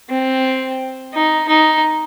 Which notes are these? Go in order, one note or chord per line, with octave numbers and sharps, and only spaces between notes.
C4
D#4
D#4